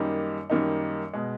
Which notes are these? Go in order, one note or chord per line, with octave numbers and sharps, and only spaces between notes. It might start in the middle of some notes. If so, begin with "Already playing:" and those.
Already playing: F#2 D#3 G3 A#3 D#4
F#2 D#3 G3 A#3 D#4
B2 G#3